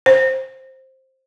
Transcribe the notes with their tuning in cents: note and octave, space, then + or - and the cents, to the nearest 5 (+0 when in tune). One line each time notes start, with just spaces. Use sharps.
C5 +10